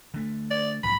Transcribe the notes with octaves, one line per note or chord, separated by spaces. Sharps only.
D3 A3
D5
B1 G#2 F3 B5